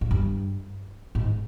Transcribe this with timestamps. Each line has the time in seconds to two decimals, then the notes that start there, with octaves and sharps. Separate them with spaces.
0.01 G#2
0.11 G2
1.15 G#2